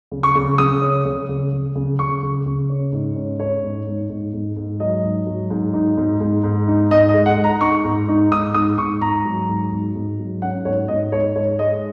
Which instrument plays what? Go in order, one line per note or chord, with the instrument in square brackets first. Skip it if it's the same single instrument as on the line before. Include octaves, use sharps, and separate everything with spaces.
[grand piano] C#3
C#6
C#3
C#3 D#6
C#4
C#3
C#3
C#3
C#3
C#3 C#6
C#3
C#3
C#4
G#2
C#4
C#4 C#5
G#2
G#2
G#2
G#2
G#2
F#3 D#5
G#2
F#3
G#2
D#4
G#2
G#2
G#2
D#4
G#2 D#5
D#5
G#3
F#5
G#3
A#5
D#4 C#6
G#2
D#4
G#2 D#6
G#2 D#6
G#2 C#6
G#2 A#5
F#3
G#2
G#2
G#2
F#3
C#4 F#5
G#2 C#5
G#2 D#5
G#2 C#5
G#2 C#5
G#3 D#5